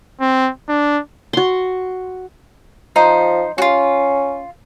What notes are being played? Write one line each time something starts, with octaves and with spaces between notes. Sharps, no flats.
C4
D4
F#4 C6
F3 D#4 C5
C#4 F4 F#4